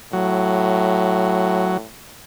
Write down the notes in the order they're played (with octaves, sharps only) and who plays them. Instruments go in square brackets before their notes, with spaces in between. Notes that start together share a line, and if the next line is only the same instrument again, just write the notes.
[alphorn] A2 [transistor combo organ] F#3